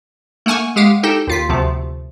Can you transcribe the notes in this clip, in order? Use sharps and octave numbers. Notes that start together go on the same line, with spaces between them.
A3 A#3 F#5 G#5 C#6
G#3 G4 F5 F#5
D#4 G4 A4 G5
D#2 F4 B6
D2 C3 F3 A3